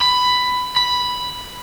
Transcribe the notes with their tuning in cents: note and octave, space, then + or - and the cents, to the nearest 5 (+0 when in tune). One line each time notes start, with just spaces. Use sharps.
B5 +10
B5 +0